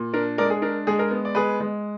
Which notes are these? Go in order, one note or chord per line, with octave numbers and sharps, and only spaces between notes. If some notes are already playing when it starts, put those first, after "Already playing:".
Already playing: A#2
D4 A#4
G#3 A#4 D5
G#4
D4 A#4
G#3 G#4
A#4
B3
D5
G#3 G#4 B4
G#3